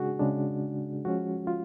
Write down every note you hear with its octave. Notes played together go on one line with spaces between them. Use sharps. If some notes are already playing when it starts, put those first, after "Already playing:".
Already playing: C#3 G#3 D4 F#4 G#4
C#3 G#3 D4
F3 G#3 C#4 F#4
F4